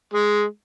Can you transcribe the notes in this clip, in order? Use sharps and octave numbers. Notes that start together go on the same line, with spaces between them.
G#3